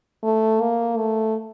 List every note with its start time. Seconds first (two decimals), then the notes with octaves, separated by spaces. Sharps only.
0.23 A3
0.60 A#3
0.97 A3